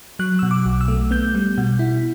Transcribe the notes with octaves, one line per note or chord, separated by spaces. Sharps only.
F#3 F#6
B2 E6
D6
B1
E6
A3
B3 G6
G3
B2
E4